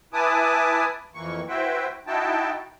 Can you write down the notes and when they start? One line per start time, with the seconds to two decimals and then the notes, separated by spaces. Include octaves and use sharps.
0.13 E4 B4 G#5 A5 D6 D#6
1.15 F2 E3 A#3 C#6
1.48 E4 F#4 B4 C5 E5 G5
2.07 D#4 E4 F#4 G5 A5